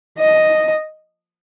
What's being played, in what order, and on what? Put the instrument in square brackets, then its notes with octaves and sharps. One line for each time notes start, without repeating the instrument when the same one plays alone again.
[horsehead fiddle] D#5